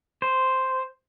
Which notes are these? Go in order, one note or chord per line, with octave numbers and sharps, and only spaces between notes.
C5